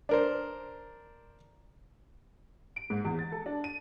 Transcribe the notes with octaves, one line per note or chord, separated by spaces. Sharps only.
D4 A#4 C5
D7
G#2
E2
A6
A4
D4
D#7